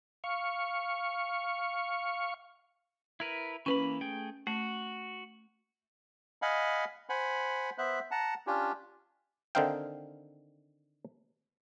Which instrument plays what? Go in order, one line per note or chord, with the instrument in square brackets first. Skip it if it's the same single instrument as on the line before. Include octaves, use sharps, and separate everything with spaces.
[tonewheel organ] F5 C#6
[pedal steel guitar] E4 A#4 B4
[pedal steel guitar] E3 A#3 B5 [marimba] C#4 B4
[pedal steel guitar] A3 G#4 G5
[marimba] A3 [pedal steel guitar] F#4
[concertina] D#5 F5 F#5 G#5 B5
C5 F#5 G#5 B5
B3 C5 E5 F#6
F#5 A5 A#5
C#4 D4 F4 G4
[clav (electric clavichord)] D3 D#3 C4 D#4 F5 G5